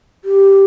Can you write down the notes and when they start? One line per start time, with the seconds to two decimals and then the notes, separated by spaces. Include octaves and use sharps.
0.25 G4